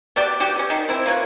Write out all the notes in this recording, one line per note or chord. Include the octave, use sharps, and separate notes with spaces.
B3 F#4 G4 D5
F#4 G4
B3 C#4
D#3
C4 E4
A#3 F4 B4 C#5